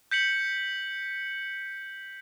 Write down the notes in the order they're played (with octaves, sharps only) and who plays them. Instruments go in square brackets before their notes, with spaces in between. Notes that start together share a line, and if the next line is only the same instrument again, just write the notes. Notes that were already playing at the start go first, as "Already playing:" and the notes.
[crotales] G6 B6 C#7 F#7